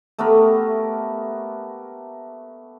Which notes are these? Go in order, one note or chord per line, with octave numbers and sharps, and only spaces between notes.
A3 B3 G4 A#4